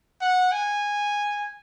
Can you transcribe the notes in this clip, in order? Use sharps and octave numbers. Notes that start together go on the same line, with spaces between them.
F#5
G#5